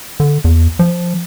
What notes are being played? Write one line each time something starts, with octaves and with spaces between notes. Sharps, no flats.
D3
E2
F3